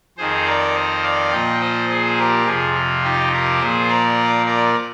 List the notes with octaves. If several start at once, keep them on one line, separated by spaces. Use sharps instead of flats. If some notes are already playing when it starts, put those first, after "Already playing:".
F2 D#3 G#4 C5
A#4 D5
C5 D#5
D5 F5
A#2 F3 D#5 G5
C5 D#5
G#4 C5
G4 A#4
F2 C3 F3 F4 G#4
F4
D#4 G4
G4 A#4
A#2 F3 G#4 C5
A#4 D5
A#4 D5